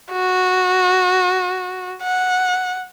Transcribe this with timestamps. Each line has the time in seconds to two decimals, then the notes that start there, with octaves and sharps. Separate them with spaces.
0.13 F#4
2.02 F#5